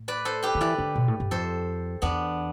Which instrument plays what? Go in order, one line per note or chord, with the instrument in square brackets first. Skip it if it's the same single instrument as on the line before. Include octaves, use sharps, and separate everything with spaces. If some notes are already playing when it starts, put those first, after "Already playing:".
Already playing: [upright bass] A2
[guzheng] B4 D5
A4 C5
G4 B4
[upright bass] D3
[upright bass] E3 [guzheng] B4 D5
[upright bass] D3
B2
A2
G2
[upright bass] F2 [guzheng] A4 C5
[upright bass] E2 [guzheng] B3 D4